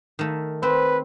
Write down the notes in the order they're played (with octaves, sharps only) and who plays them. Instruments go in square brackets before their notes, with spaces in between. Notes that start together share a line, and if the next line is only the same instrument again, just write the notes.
[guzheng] D#3 A3
[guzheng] C4 [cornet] B4